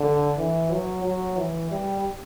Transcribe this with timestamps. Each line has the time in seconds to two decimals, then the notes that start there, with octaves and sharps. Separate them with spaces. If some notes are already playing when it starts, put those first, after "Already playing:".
Already playing: D3
0.38 E3
0.71 F#3
1.04 F#3
1.37 E3
1.71 G3